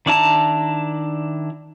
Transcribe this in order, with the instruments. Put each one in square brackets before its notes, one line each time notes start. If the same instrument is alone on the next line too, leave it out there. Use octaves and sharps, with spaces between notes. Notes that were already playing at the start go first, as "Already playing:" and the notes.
[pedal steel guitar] D#3 D4 E4 A5 A#5